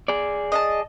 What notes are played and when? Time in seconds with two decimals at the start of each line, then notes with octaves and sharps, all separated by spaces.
0.08 G#4 D5
0.52 D#5 F5 A5